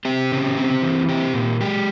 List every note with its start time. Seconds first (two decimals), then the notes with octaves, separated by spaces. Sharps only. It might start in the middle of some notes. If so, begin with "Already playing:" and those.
0.05 C4 G4
0.32 C#3
0.58 C4
0.82 E3
1.09 C4 G4
1.34 A#2
1.60 G#3 G4